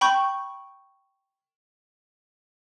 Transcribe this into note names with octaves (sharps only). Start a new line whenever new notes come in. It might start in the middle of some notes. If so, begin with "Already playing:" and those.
G5 B5 C#6 G6